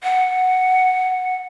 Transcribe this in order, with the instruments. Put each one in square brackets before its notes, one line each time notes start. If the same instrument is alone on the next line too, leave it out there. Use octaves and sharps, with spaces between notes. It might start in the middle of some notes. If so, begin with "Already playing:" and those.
[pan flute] F#5